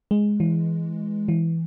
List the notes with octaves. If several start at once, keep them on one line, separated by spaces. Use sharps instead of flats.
G#3
E3
E3